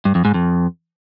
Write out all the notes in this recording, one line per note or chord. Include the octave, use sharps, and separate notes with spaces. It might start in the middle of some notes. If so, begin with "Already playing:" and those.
G2
F2
G#2
F2